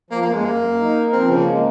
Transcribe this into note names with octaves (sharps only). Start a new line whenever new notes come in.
F3 A#3
A#3
F#2
G#3
F#2 A#3
F#2
D#4
A#4
F3 C4
C#3 A#3
G#3